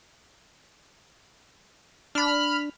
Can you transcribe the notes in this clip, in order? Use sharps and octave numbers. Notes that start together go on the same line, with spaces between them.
D4 B5 F6